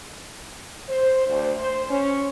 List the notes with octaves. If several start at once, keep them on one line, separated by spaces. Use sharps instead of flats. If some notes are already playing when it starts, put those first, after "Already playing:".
C5
D2
C5
C#4